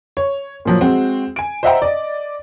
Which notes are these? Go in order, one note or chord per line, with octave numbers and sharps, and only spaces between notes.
C#5
A#2 F3 F#3
G#3 C4 F#4
G#5 D7
C5 D#5 E5 F#5 G5 A#5
D5 D#5